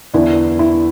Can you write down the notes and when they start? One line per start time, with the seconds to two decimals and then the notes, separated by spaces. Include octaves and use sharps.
0.14 E2 D3 B3 D4 E4
0.59 E4